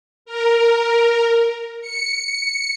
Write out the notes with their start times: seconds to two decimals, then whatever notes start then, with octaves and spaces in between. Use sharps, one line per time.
0.25 A#4
1.81 C#7